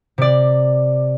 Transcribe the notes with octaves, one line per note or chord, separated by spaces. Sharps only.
C3 D5